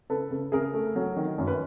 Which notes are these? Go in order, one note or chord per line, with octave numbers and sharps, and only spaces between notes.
C#3 A4 B4
C#3
C#3 G#4 A#4
A3
F#3
D#3
F#2
B4